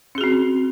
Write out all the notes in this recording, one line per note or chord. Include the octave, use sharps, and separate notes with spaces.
C4 C#4 F#4 G#4